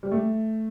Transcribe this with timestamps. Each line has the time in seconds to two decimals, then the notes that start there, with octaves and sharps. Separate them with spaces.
0.03 G3
0.12 A3